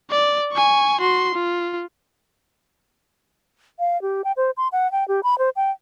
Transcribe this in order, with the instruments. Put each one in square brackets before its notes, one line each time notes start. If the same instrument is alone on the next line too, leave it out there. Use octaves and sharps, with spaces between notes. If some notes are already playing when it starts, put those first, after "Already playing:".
[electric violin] D5
G#5 C#6
F#4 C6
F4
[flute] F5
G4
G5
C5
C6
F#5
G5
G4
B5
C5
G5